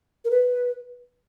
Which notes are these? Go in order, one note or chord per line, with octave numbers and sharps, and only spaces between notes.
A#4
B4